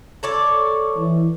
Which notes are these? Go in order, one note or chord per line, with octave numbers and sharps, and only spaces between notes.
A4 C#5 D5
E3